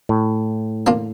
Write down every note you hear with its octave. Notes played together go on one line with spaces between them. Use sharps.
A2
A#3 D4 F4